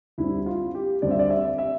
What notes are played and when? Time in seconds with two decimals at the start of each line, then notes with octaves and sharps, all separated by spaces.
0.18 D2 D3 G3 C4 E4
0.46 F4
0.75 G4
1.02 D2 D3 G3 C4 D5
1.11 E5
1.19 D5
1.30 E5
1.58 E5